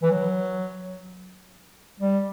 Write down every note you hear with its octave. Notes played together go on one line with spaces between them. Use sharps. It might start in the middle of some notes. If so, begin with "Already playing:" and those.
E3
F#3
G3